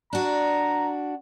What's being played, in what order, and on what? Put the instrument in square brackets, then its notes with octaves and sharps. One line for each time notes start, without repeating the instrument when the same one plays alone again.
[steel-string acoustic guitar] D4 F#4 [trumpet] A#5